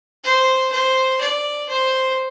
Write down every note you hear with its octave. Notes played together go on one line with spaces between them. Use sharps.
C5
C5
D5
C5